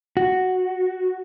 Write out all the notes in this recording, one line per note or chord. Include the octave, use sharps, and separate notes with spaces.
F#4